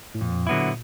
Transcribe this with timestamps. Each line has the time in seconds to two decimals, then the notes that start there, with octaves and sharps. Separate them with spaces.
0.15 A2
0.21 F2 A#2
0.47 D3 F#3 B3 E4